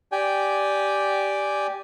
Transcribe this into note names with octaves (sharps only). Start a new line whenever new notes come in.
G4 D5 G5 G#5